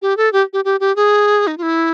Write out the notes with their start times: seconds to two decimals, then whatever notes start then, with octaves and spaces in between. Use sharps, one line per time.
0.02 G4
0.17 A4
0.33 G4
0.53 G4
0.65 G4
0.80 G4
0.96 G#4
1.47 D#4
1.58 F4
1.63 E4